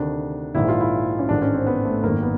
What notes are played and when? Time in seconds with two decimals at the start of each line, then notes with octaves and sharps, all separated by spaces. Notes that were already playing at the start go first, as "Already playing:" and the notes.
Already playing: D2 C3 D#3 D4
0.55 A#1 G#2 D#3 E4
0.69 F4
0.80 E4
1.19 C#4
1.29 A1 G#2 D#3 D4
1.42 C#4
1.53 C4
1.66 B3
1.85 A3
2.03 G#1 F#2 D#3 A#3
2.22 B3